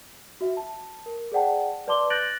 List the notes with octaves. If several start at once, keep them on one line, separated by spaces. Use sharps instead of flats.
F#4 E5
A5
A#4
G#4 C5 D5 F#5 G5 A5
B4 D5 A5 C6 D6 G7
F#6 G6 A6 A#6 D7 F#7